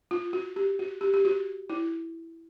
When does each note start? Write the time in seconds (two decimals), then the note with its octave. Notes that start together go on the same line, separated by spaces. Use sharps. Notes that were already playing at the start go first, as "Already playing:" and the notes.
0.11 F4
0.33 F#4
0.56 G4
0.79 F#4
1.01 G4
1.14 G4
1.25 F#4
1.70 E4